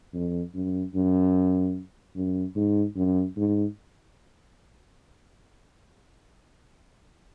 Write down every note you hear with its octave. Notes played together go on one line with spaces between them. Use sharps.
F2
F#2
F#2
F#2
G#2
F#2
G#2